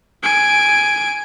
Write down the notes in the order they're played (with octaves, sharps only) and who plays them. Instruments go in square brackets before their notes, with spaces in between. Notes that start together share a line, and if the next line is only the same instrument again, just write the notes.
[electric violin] G#5 D7